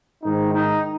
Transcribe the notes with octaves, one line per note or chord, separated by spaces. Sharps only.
G#2 D#3 D#4
D#4